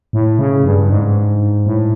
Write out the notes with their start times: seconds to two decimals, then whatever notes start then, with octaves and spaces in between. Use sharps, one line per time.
0.13 A2
0.39 C#3
0.65 G2
0.90 G#2
1.66 A2